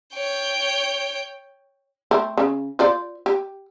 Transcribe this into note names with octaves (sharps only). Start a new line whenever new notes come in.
C#5 G5
A3 C4
C#3
F4 C5 D5
G4